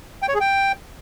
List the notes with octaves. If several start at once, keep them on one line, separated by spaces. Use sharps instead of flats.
G5
C#5
G#4
G5